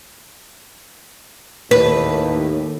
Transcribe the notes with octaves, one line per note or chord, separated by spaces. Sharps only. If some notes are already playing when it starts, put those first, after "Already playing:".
D#2 A2 B4